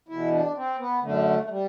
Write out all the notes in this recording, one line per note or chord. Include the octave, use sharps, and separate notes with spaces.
E2 B2 E4
D4
C4
B3
F#2 D3 A3
A3
G3